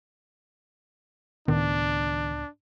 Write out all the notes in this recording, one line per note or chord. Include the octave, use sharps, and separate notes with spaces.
C#2 A2 D#3 B3 D4